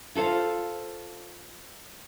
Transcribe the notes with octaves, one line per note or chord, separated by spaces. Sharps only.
F4 A4 C5 F5